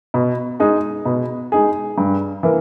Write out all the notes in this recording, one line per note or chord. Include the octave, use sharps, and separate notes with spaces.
B2
G#3 D#4 G#4
B2
G#3 D#4 G#4
G2
E3 A#3